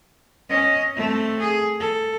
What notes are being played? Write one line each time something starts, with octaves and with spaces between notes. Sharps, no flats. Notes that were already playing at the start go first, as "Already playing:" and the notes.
C#4 D#5
A3 C4
G#4
A4